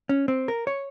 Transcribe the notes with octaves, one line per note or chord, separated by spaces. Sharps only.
C#4
C4
A#4
C#5